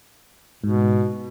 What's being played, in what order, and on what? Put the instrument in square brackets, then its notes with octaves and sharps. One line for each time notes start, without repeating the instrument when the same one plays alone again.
[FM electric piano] G#2 [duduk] B2